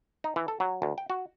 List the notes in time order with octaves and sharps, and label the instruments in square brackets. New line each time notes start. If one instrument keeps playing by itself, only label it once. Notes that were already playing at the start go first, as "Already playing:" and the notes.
[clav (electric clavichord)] D#4
E3
A4
F#3
D2
G5
F#4